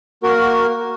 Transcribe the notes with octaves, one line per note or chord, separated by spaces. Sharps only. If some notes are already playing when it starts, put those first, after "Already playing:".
A#3 F#4 A#4